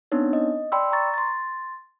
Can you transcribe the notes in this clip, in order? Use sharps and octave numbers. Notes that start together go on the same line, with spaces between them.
B3 C4 D4 D#4 C#5
D#5
D5 G5 B5 C6 E6
A#5 C#6 A6
C6 A6